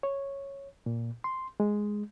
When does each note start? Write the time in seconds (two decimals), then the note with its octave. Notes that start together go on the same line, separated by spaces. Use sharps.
0.03 C#5
0.86 A#2
1.24 C6
1.60 G#3